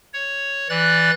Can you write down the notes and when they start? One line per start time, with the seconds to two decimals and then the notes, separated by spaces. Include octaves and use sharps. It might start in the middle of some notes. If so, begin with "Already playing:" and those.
0.14 C#5
0.70 E3 D5 F#6 A6